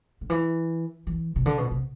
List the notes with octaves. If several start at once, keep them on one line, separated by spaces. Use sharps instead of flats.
D3
E3
E3
C3
D3
B2
C3